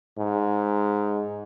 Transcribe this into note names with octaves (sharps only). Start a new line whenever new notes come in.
G#2